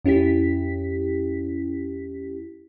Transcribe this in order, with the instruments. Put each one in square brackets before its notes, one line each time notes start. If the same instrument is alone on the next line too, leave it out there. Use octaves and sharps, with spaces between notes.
[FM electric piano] F2 C#4 E4 G4 B6